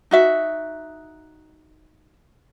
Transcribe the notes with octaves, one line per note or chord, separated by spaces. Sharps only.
D#4 F#4 E5